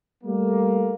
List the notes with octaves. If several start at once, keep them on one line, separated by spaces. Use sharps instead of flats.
G3 A3 A#3